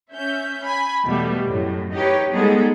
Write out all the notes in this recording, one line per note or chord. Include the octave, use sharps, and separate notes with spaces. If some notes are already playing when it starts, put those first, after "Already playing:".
C#4 E5 G6
G#5 B5
E2 B2 G3 A3
F#2 A2
D#4 G4 B4 C#5
G3 G#3 B3 D#4 G#4 A4